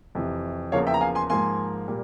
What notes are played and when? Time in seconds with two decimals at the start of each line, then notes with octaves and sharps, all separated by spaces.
0.15 F2 C3 E3
0.72 E2 C#3 F3 A#3 C#5 F5
0.87 E5 G5
0.94 A#5
1.01 F5 G#5
1.15 G#5 C6
1.30 G#2 F3 A#3 G#5 C6
1.88 A#2 G3 A#3